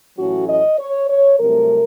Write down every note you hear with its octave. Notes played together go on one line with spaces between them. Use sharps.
A1 A2 F#3 A3 C#4 F#4
D#5
C#5
C#5
C2 C3 F#3 A3 A#4